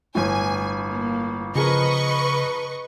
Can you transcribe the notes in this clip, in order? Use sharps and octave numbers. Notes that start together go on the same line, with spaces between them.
G1 A2 G#5
A#3
C#3 F3 G#4 A#4 B4 D#5 C#6